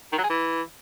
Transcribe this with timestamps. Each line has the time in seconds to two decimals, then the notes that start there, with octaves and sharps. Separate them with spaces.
0.12 D#3
0.18 F#3
0.24 G#4
0.29 E3